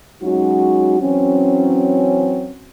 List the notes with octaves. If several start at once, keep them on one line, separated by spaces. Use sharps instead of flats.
F#3 G#3 C#4 D#4 F#4
E3 F#3 C4 C#4